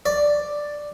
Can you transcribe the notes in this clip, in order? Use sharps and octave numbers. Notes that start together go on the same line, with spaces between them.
D5